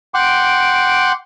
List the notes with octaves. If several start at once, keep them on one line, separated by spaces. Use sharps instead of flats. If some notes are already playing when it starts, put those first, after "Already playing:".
F#5 G5 C6 D6